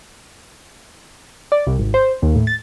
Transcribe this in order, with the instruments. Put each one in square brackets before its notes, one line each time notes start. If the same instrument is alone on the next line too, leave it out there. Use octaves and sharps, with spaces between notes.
[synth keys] D5
C2
G#1
C5
D#2
A2
A6